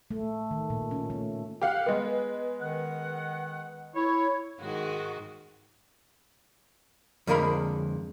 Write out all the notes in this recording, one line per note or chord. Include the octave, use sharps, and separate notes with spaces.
A3
D#3
A#2
C#4
A3
G4 F5 F#5
G#3 B3
D#3 F#5
E4 C#5
G#2 D#3 G#3 F#4
F2 D3 G#3 A#4 B5